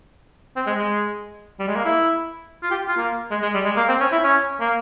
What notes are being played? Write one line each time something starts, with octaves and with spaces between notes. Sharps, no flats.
C4
G#3
G#3
G3
G#3
A#3
E4
F4
G4
F4
A#3
G#3
G#3
G3
G#3
A#3
C4
C#4
E4
C#4
A#3